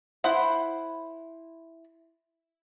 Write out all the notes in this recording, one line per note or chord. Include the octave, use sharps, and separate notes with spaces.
E4 B4 C5 F#5